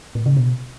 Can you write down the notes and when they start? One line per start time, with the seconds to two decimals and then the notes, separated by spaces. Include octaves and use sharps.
0.15 A2
0.26 C#3
0.37 B2